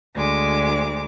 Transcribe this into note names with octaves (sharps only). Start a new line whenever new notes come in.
D2 G#3 D6